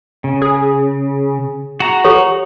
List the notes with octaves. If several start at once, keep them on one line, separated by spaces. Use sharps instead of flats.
C#3
G#4
F#4 A#5
G4 A4 C#5